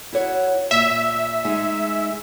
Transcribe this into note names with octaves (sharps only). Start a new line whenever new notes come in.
E4 F#4 C#5
A#2 E5
G#3 D#4 G#4